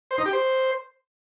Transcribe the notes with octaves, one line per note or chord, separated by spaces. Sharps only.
C5
D#4
G4
C5